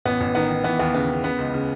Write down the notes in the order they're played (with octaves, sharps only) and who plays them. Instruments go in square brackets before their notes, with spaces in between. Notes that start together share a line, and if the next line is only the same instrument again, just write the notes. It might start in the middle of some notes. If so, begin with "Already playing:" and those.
[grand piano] A1 B3
A1
D#3 B3
D#3
E3 B3
D#2 B3
C#3 B3
C#3
C#3 B3
C#2
C#3